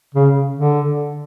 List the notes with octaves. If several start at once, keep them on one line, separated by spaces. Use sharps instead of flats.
C#3
D3